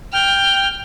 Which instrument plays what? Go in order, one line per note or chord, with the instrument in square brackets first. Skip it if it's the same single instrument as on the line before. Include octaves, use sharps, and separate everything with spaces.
[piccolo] G5 [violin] F6